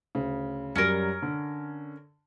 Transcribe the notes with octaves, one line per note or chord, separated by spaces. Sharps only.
D2 C#3
F#2 F#3 G3 C#4 A#4
D3